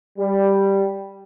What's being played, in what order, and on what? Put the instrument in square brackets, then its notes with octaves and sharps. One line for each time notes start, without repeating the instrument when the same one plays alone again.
[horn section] G3